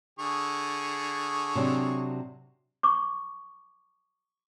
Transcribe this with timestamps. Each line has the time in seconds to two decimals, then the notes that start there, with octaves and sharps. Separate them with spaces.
0.19 D3 G#4 C#6
1.55 C3 F#3 D4
2.83 C#6 D6